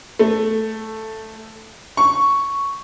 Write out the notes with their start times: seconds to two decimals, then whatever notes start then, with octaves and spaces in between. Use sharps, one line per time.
0.19 A3
1.97 C#6